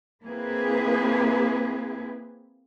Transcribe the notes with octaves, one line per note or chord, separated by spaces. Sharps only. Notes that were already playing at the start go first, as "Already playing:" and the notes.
A#3 C4 E4 G#4 B4